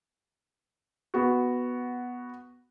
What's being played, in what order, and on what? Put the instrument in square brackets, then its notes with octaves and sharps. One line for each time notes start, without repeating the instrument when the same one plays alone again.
[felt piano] B3 F#4